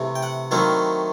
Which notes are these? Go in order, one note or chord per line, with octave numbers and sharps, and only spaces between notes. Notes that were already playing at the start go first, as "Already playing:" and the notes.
Already playing: C3 E3 A3
G5
F#5
D#3 F#3 A3 C4 E4 F5